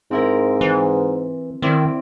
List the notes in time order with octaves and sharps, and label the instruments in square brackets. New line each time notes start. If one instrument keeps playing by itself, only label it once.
[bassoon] G#2 [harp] C4 E4 A#4
[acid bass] E3
[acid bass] D#3 [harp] C4 E4 D5